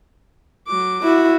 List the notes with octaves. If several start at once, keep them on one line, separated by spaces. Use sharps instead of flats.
F#3 D6
E4 F#4